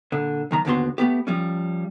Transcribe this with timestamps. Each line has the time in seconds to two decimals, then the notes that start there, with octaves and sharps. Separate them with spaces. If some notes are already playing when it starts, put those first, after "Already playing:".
0.12 A#2 D3
0.51 B1 D#3 A#5
0.65 D#2 G#2 D3 B3 F#4 C6
0.98 A3 B3 G4
1.27 F3 G3 C#4